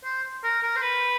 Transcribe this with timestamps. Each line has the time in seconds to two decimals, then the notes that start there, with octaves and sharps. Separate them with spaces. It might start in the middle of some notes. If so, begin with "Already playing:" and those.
0.04 C5
0.43 A#4
0.63 A#4
0.76 C5
0.82 B4